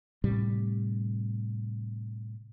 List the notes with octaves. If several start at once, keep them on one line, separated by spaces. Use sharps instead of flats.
A2 C3 G3